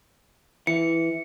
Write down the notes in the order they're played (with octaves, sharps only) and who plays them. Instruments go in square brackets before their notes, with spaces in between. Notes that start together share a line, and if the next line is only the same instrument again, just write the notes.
[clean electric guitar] E3 [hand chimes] C#7